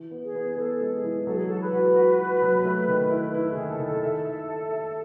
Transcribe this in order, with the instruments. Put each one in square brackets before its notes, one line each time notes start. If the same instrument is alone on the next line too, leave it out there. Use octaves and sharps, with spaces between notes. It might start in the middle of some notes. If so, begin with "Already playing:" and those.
Already playing: [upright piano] E3
B3
[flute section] G#4
[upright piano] B3
[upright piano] B3 [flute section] A4
[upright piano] G#3
[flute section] G#4
[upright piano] E3
[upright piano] F#3 [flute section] A4
[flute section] G#4
[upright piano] F#4 [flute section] A4
[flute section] B4
[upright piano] F#4
F#4
F#4
F#3
A3
D#3
E4
[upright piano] E4 [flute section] A4
[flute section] G#4
[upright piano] D#3
[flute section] A4
[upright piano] D#3
[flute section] A4
[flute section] A4 [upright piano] E5
[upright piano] E5
E5
E5